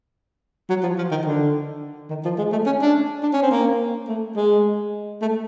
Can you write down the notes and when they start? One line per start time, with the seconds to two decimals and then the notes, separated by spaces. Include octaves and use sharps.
0.69 F#3
0.83 F3
0.98 F3
1.11 D#3
1.25 D3
2.10 D#3
2.25 F3
2.38 G#3
2.52 A3
2.66 C#4
2.81 D4
3.23 D4
3.33 C#4
3.42 C4
3.51 A#3
4.08 A3
4.36 G#3
5.22 A3